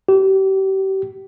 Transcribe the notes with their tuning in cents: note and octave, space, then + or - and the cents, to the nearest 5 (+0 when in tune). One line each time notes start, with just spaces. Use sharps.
G4 -35